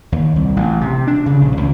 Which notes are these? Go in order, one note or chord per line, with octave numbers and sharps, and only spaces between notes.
D#2
C2
A1
C3
D4
C#3
A#1
C#2